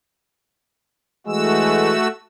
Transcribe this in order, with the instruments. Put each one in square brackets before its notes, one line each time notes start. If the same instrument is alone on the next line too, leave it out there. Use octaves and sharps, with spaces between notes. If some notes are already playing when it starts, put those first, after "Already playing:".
[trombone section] E3 G#3 [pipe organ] A3 F#4 E6